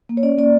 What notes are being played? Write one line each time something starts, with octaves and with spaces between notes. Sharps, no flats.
A#3
C#5
C#4 D5
A#3 D5